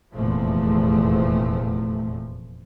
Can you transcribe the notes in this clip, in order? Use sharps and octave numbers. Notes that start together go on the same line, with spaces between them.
F1 E2 A#2 F3 A3